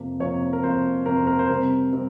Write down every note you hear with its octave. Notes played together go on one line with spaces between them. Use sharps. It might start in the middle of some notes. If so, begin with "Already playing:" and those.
Already playing: F2 C3 F3 A#3
F2 C3 F3 A#3 C#5
A#4
F2 C3 F3 A#3 C5
F2 C3 F3 A#3 A#4
C5
A#4
C5
C3 G3 C4 A#4
G3 C4